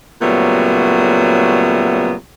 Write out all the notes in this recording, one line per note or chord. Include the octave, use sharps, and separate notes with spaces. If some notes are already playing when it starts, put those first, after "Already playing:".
A#2 C#3 F#3 G3 A3 B3